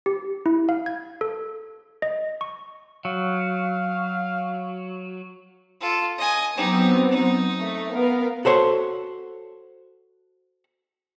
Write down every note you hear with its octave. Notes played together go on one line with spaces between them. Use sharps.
G4
E4
F5
G#6
A4
D#5
C#6
F#3 F5
F4 A4
D#5 G#5
F#3 B3 C4 D#4 G4
D#4
A3
B3 A#4 F5
F#4 A4 C5 C#5